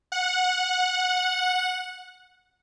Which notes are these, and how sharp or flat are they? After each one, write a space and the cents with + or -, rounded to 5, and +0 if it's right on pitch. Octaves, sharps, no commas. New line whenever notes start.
F#5 -15